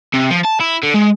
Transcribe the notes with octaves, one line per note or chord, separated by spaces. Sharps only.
C3
F3
A5
E4
D3
G#3